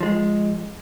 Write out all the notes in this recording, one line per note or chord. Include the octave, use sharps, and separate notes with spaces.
F3 G#3